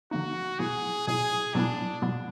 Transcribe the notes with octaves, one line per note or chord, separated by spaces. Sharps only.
D3 F3 A#3 D#4 F#4
B2 F#3 B3 E4 G#4
B2 F#3 B3 E4 G#4
B2 F#3 B3 D4 E4
B2 F#3 B3 E4